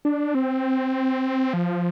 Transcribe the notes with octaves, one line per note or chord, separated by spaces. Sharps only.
D4
C4
F3